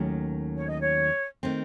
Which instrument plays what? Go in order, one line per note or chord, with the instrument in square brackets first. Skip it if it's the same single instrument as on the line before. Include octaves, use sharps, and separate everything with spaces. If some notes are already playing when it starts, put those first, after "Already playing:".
Already playing: [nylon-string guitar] D#2 D#3 F#3 A3 C#4
[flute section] C#5
D#5
C#5
[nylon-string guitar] D#3 A3 C4